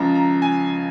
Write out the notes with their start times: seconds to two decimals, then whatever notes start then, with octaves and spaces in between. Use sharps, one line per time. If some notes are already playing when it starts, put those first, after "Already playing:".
Already playing: C#2 C#3 F3 A#5
0.15 A#5
0.42 G#5